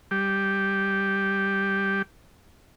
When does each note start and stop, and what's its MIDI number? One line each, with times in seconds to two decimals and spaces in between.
0.11 2.02 55
0.11 2.02 67